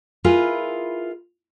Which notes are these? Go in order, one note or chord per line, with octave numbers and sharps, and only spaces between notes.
E4 F4 G#4 A#4 B4